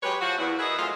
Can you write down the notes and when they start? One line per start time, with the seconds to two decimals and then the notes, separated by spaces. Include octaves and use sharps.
0.03 F#3 G#3 G4 B4 C#5
0.21 F3 F#4
0.38 E2
0.59 F#4 G#4 A#4 B4 D#5 E5
0.79 F#2 A#2 F3 G#3 A3 F4